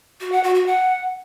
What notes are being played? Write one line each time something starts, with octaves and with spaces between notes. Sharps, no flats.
F#4
F#5
F#4
F#4
F#5